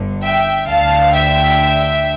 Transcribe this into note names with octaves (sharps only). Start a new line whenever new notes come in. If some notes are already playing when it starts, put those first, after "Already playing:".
Already playing: G1 G2 D3
E5 G5
D2 D3 F5 A5
E5 G5